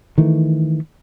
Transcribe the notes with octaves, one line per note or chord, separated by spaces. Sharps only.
D#3 E3 A3